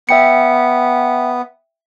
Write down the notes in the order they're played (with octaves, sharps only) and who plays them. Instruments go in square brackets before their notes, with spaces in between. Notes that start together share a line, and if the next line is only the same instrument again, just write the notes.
[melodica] B3 [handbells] E5 G5 C#7